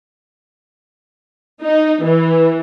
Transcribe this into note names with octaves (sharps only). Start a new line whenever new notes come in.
D#4
E3